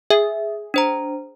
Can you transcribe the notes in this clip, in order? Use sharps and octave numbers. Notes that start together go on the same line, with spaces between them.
G#4 E5
D4 C5 A#5